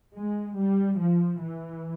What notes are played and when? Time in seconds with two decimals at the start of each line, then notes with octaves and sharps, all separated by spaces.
0.14 G#3
0.57 G3
0.99 F3
1.41 E3